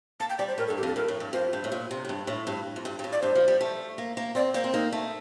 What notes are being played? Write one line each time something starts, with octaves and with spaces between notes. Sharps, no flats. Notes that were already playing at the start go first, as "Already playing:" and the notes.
A#3 A5
G5
G3 D5
C5
A2 A#4
A4
G2
G4
F2 A4
G2 A#4
A2
G2
F2 C5
G2
A2
A#2
C3
A2
G2
A2
G2
F2
G2
G2
A2
D5
G2 C5
F3
G3
A3
A#3
A#3
C4 D5
A#3 C5
C4
A#3 D#4
A3